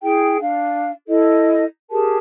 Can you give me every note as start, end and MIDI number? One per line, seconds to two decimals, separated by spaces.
0.02 0.37 64
0.02 0.37 68
0.02 0.37 79
0.40 0.90 62
0.40 0.90 77
1.07 1.63 64
1.07 1.63 69
1.07 1.63 75
1.90 2.18 67
1.90 2.18 68
1.90 2.18 70
1.90 2.18 81